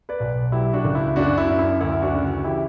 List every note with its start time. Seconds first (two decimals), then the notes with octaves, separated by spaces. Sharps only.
0.09 B4 D5
0.20 B1
0.52 F#3 E4 G4
0.73 D4 F#4
0.85 C#2
0.95 E4
1.16 F#2 D4 F#4
1.38 E4
1.49 F#2
1.59 E4
1.81 D2 E4
2.02 D4 F#4
2.13 C#3
2.44 E3 E4 G4